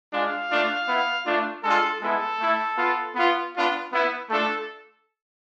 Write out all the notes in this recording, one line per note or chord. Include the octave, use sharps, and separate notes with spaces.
G#3 D4 F4 F5
A3 D4 F4
B3 E4
A3 D4 F4
G#3 D4 F4 A4
G#3 B3 E4 A4
A3 E4
B3 F4
B3 F4
B3 D4 F4
B3 E4
A3 D4 F4 A4